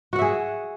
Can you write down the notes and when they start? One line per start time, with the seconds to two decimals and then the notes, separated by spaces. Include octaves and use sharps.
0.13 F#4
0.16 F#5
0.19 E5
0.22 G#4